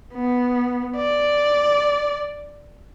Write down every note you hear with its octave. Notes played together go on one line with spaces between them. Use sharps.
B3
D5